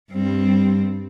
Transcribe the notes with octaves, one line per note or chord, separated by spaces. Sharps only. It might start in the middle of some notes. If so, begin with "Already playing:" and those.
G2 G3 C4